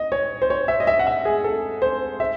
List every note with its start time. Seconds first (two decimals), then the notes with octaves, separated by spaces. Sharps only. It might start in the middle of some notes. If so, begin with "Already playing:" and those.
Already playing: D#5
0.12 C#5
0.42 C5
0.50 C#5
0.68 E5
0.80 D#5
0.87 E5
0.99 F#5
1.07 E5
1.25 G#4
1.44 A4
1.82 C5
2.20 E5